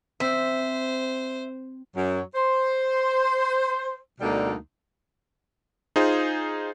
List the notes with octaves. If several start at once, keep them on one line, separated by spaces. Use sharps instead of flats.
C4 C5 E5
F#2 F#3
C5
D2 B2 D3 G3 A#3 D#4
D#4 F4 G#4 C5